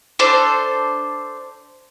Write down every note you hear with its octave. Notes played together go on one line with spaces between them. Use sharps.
D4 A4 C5